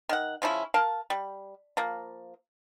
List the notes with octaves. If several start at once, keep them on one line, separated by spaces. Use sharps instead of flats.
D#3 F#5
C#3 F3 C#4 E4
A#4 F5 A5
G3
F3 A#3